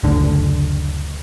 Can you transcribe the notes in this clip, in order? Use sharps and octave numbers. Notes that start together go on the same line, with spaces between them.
F#1 D2 D3